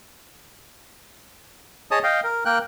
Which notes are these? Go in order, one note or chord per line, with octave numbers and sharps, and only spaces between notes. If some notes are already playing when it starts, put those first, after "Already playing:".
G#4 C#5 D#5 A5 D#6
D#5 F5 G5
A#4
A#3 A#4 G5 F#6